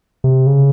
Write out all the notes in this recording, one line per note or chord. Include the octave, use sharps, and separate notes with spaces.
C3
C#3